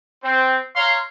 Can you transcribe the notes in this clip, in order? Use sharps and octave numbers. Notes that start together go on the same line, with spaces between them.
C4
C#5 F5 A#5 C6